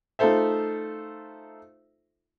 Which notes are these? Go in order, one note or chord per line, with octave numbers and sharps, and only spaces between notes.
A3 D#4 F4 A4 C5 E5